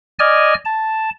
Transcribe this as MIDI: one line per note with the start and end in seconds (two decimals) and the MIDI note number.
0.19 0.54 74
0.19 0.54 75
0.19 0.54 80
0.19 0.54 89
0.65 1.10 81